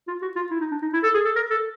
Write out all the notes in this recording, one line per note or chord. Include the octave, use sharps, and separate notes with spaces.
F4
F#4
F4
E4
D#4
D4
D#4
E4
A4
G#4
A4
A#4
A4